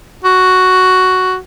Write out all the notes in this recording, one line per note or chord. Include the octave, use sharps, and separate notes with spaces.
F#4